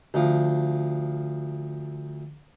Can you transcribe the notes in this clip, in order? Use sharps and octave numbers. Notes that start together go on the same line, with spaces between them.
D2 F3